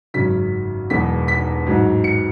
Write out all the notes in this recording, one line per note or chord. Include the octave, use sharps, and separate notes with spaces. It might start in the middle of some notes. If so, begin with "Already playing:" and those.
G#1 F#2 C#3 F#3 B6
E1 E2 B2 F#3 B6
B6
A1 G#2 F#3
C#7